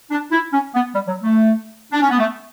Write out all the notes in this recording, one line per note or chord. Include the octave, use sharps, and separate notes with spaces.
D4
E4
C#4
B3
G3
F#3
A3
D4
C#4
B3
A3